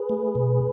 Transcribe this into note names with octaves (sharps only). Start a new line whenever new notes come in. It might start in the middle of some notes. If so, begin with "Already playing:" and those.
Already playing: G#4 B4
A3
B2